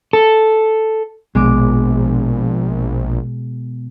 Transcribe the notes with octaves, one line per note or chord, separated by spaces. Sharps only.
A4
A#1 B2 G#3 D6